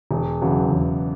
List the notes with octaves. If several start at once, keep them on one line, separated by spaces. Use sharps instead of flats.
E1
E2 C#3 F#3
E1